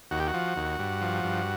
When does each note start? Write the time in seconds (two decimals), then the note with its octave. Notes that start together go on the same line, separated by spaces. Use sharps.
0.11 D#2 F#4
0.19 G4
0.27 F#4
0.34 F3
0.56 D#2
0.79 G2
1.01 F3
1.24 G2